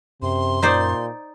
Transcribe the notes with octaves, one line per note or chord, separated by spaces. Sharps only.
F#2 C3 C6
A#2 D#4 C5 D5